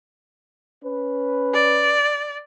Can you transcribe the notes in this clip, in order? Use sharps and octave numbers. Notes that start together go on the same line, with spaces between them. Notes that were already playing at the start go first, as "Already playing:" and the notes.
C#4 B4
D5